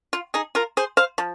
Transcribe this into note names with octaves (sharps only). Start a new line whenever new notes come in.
F4
D#4 G#4
F4 A#4
G#4 C5
C5 F5
F3